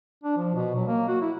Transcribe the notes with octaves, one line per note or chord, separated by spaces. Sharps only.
D4
F3
B2
F#3
A#3
F#4
E4